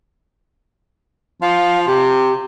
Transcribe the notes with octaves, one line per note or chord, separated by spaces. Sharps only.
F3 F5
C3 G4